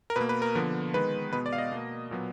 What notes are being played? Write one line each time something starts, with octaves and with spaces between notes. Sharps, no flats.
A#4
B2 A#3 B4
B4
A#4
D3 F3 B3
D#3 G#3 B3 B4
B2 G#3 B3 B4
D5
F5
D#5
B2 A#3
A#2 F#3 B3